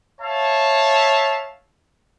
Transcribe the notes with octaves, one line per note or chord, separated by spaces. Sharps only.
C#5 E5 F5 A5